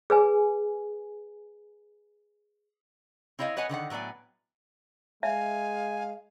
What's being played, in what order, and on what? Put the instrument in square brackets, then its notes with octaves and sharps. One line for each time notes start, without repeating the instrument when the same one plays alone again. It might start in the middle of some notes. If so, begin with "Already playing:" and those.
[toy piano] G#4 B4 G#5
[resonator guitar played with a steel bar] C4 E4 C#5 D#5 F5
B4 C#5 D#5 F#5 G#5
D3 D#3 B4 F#5
A2 F#3 B3 D5 G#5
[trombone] G#3 [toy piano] E5 [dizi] F5 [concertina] G#5